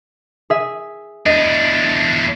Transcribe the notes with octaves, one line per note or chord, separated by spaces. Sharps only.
G#4 E5
E2 D4 D#5 D#7